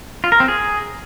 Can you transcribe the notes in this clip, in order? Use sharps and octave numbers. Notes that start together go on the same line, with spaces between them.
F4
A#4
C4
G#4